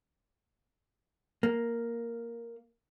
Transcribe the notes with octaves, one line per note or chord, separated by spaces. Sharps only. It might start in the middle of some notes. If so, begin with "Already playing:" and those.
A#3